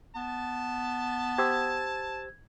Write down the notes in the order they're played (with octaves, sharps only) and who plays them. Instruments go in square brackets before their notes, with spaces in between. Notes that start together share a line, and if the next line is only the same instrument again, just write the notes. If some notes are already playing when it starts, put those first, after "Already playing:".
[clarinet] B3 [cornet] A5
[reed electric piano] G4 C5 E6 [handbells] G#6